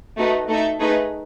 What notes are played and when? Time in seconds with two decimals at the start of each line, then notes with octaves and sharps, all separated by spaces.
0.18 A3 D#4 F#4 B4
0.48 A3 D#4 A4 E5
0.79 A3 D#4 G#4 B4